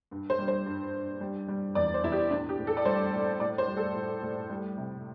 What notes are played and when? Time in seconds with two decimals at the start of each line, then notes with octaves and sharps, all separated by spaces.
0.11 G2
0.30 C5
0.39 G3
0.48 C5
0.66 G2
0.94 G2
1.21 G3
1.48 G3
1.75 E2 D5
1.94 C5
2.03 E2 E4
2.12 G4
2.30 A2 D4
2.49 G4
2.58 A2
2.67 A4
2.77 D5
2.85 G3 C5
3.13 A2
3.40 A2 D5
3.58 C5
3.68 G3
3.77 A4
3.95 A2
4.22 A2
4.50 G3
4.77 C3